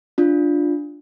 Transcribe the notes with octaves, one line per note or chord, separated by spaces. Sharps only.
D4 F4